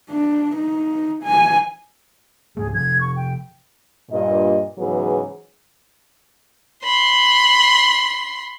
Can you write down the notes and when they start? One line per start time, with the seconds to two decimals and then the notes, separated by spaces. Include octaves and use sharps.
0.10 D4
0.56 D#4
1.24 G#5
2.57 C#2 G#2 A3 G#4
2.74 C3 F3 G#6
3.01 C#6
3.16 G5
4.11 G2 A#2 D#5
4.78 G#2 C#3 E3 F#3 B3 G#4
6.84 B5 C6